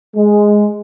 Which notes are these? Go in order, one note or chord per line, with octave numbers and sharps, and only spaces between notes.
G#3